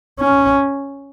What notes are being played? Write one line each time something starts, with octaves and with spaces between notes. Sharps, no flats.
C#4